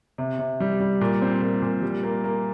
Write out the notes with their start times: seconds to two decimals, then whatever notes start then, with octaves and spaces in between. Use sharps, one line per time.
0.18 C3
0.39 C3
0.60 G3
0.80 G3
1.01 A#2
1.22 C4
1.42 A#2
1.62 A#2
1.82 G3
2.03 A#3
2.24 A#3